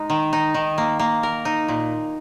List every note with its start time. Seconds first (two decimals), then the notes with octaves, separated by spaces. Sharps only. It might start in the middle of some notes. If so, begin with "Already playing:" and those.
Already playing: G#3 D#4
0.10 D#3
0.33 D#4
0.54 D#3
0.78 A#3
0.99 A#3
1.23 A#4
1.45 D#4
1.68 A#2